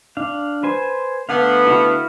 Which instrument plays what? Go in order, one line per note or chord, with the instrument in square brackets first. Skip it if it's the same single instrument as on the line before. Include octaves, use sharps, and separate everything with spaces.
[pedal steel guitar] D4 F5
B4 C5 G#5
[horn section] D3 A3 B3 [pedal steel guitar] F5
[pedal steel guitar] E4 F#4 F5